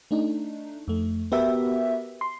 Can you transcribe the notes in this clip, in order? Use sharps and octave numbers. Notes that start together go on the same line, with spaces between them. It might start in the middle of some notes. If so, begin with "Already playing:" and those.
A3 D4 D#4
F2 A3
B3 F#4 G4 A#4 B4 E5
C6